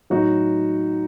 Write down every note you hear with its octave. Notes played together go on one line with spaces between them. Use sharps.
A2 F#3 D#4 F#4